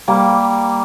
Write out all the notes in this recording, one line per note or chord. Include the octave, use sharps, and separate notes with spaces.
G3 A#3